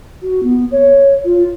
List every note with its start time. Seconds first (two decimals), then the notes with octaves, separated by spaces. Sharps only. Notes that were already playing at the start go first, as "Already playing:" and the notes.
0.22 F#4
0.43 B3
0.72 C#5
1.25 F4